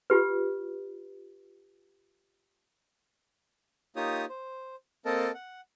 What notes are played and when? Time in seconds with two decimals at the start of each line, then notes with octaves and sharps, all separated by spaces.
0.10 F4 G4 B4
3.96 A#3 D#4 F4 G4 C#5 D#6
4.29 C5
5.05 A#3 C4 A4 A#4 D#5 A5
5.34 F#5